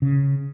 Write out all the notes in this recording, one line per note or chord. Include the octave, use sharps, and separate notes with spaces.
C#3